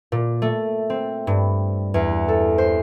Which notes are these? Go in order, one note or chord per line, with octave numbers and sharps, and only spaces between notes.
A#2
A3
C4
G2
E2
A4
C5